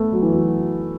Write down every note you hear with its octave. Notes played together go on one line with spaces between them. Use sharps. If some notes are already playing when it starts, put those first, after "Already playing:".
Already playing: A3 B3
F#3
E3
F#3